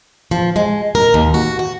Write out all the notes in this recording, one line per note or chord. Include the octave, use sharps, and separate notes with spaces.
F3
G#3
A#4
D#2
F#4
F#4